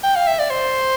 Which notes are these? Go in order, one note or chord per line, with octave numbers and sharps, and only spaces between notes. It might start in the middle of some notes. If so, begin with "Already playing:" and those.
G5
F5
E5
D5
C5